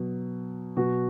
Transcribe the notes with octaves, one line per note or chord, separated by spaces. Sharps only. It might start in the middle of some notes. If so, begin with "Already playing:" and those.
Already playing: B2 F#3
B2 F#3 F#4